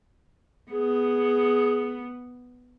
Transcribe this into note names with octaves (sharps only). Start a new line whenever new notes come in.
B3 G#4